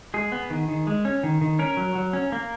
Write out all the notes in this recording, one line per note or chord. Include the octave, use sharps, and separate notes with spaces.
G#3 G#4
B3
D#3
D#3
G#3
C#4
D#3
D#3
C#4 A#4
F#3
F#3
C#4
A#3